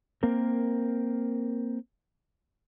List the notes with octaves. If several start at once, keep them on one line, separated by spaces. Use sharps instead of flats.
A#3 C4 A#4